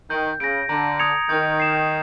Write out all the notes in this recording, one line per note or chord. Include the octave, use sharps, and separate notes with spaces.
D#3 G6
C#3 A#6 D7
D3 A#5
D#6 G#6 C#7 F7
D#3 G6
C7 E7